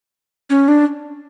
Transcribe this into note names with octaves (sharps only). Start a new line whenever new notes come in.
C#4
D4